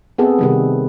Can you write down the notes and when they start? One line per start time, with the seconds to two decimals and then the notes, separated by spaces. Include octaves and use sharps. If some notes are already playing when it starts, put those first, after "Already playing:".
0.18 B3 C4 G#4 A4
0.39 C3 D#3 G3